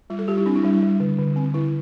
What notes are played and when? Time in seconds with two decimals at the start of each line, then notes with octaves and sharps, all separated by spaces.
0.10 G3 F4
0.19 A4
0.28 G3 G4
0.37 E4
0.46 C4 D4
0.55 E4
0.63 G3 D4
0.73 E4
0.83 G3
1.00 D3
1.18 D3
1.36 C4
1.54 D3 E4